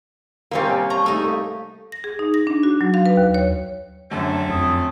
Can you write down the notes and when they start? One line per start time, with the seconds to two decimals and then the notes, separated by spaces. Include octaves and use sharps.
0.51 C3 G3 A#3 C4 C#4
0.66 C#5 G#5
0.90 C#5 A5 A#5 C#6
1.06 A3 D#4 G4
1.24 A4 F5
1.92 A#6
2.04 G#4
2.19 D#4
2.34 A#6
2.47 D4
2.63 F#4
2.81 F#3
2.94 F5
3.06 B4
3.17 D#2
3.34 C#5
4.11 F#2 D3 A3 C4 C#4
4.49 F2 D#6